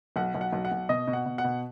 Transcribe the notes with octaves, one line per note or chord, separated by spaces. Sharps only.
B1 F#5
B1
F#5
B1
F#5
B1
B2 D#5
B2
F#5
B2
F#5
B2